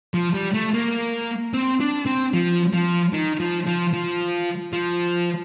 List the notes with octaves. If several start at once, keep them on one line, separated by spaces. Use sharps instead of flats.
F3
G3
A3
A#3
C4
D4
C4
F3
F3
D#3
F3
F3
F3
F3